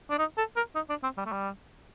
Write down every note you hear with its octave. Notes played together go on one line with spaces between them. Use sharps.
D4
D#4
A4
A#4
D#4
D4
C4
G3
A3
G3